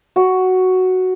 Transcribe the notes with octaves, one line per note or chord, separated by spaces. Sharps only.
F#4